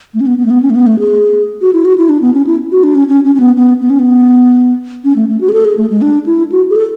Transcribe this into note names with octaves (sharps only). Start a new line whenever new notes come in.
A3
C#4
B3
B3
A3
B3
C#4
A3
B3
A3
G#4
F#4
E4
F#4
E4
D4
B3
C#4
E4
F#4
D4
C#4
C#4
C#4
C#4
B3
B3
B3
C#4
B3
C#4
A3
A3
F#4
G#4
A4
G#4
A3
G#3
D4
E4
F#4
G#4
A4